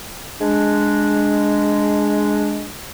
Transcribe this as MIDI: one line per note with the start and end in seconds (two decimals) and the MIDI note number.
0.40 2.69 56
0.40 2.69 62